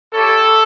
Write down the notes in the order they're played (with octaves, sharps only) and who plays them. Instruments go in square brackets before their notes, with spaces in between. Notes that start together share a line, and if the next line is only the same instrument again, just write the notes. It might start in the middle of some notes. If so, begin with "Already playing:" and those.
[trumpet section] C#4 E4 G4 A4